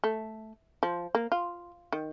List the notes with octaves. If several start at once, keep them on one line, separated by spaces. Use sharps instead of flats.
A3
F3
A#3
F4
D#3